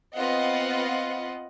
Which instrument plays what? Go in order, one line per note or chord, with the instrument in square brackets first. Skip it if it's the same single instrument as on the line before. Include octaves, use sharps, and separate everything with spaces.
[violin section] B3 C4 F4 D#5 F#5